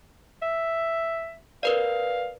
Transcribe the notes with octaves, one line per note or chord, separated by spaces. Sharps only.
E5
A#4 B4 D5 F5